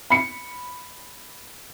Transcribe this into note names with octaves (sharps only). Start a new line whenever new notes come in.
B5 C#7